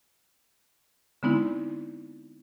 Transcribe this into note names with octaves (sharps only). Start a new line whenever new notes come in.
D3 G#3 B3 C4 D#4 E4